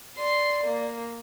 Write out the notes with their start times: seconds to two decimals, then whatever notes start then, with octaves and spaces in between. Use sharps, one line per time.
0.17 D5 C6
0.64 A#3